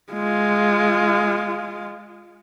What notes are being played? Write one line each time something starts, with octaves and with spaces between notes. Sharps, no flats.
G#3 F4